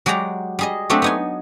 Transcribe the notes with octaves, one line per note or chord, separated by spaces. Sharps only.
F#3 G#3 G4 D5 A#5
G3 G#4 D#5
F#3 A3 C4 D4 G4
B3 D#4 G#5